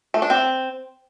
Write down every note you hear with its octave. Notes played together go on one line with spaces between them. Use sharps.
A3
D4
C4